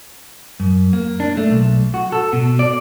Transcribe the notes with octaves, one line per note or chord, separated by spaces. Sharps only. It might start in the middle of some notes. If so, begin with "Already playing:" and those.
F#2
A#3
D4
A3
B1
F#4
A4
B2
D5